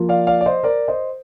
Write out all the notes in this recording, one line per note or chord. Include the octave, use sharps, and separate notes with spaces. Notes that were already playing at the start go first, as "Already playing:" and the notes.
Already playing: F3 A#3 F4
D5 F5
D5 F5
D5
C5 D#5
A#4 D5
C5 D#5